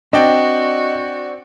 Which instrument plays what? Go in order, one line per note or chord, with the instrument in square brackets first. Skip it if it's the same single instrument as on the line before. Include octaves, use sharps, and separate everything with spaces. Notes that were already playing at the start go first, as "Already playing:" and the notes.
[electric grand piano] C4 D5 G5 [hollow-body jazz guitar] D4 [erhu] F#4 [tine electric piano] D#5